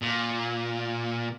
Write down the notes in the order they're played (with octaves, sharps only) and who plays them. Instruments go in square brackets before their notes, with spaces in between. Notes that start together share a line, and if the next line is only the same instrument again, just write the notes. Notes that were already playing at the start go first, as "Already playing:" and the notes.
[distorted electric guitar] A#2